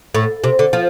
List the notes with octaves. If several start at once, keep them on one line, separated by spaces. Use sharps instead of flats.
A2
C3
D3
F3